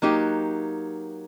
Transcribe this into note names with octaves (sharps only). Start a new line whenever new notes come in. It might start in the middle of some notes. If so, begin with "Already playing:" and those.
F#3 A#3 D#4 G4